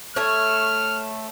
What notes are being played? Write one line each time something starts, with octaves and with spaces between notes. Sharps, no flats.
A3 C#5 F6